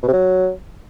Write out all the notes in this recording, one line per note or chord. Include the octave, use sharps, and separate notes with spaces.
B2
C3
F#3